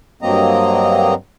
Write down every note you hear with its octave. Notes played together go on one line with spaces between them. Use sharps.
G2 F#3 A#3 C4 D#5 A#5